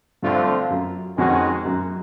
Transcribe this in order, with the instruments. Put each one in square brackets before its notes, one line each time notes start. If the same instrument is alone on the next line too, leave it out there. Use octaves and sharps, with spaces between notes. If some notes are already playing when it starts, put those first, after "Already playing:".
[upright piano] G2 [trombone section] D3 F3 A3 C4 F4
[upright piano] F#2
[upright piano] F2 [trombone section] D#3 G#3 C#4 F#4
[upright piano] F#2